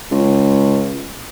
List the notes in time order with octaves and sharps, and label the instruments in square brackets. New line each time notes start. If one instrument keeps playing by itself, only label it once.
[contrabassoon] C#2